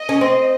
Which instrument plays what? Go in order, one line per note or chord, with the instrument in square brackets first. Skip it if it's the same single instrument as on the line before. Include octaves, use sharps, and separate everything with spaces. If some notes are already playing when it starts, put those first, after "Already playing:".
Already playing: [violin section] D#5
[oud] C#4
C4